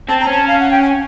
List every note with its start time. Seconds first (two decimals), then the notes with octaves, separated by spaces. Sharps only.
0.09 C4 A5
0.21 A#5
0.27 C#4
0.33 A5
0.48 F5
0.60 F#5
0.71 G5
0.82 G#5